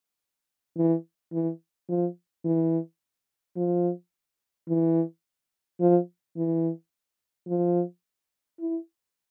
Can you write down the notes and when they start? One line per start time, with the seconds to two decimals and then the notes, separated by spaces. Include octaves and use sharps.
0.77 E3
1.33 E3
1.89 F3
2.45 E3
3.56 F3
4.68 E3
5.80 F3
6.36 E3
7.48 F3
8.60 E4